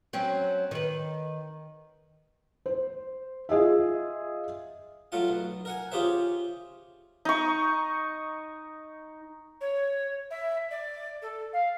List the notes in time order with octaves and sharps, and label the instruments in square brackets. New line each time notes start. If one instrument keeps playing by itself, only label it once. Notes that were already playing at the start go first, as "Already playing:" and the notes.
[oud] F#3 C4 C#4
D#3 B4
[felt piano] C5
F4 G#4 D#5 E5
[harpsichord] F#3 A3 F4 F#5
B1
A#4 F#5 G#5
C#4 F4 G4 G#4 C5 E5
[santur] D#4 C#6
[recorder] C#5
E5
D5
A4
F5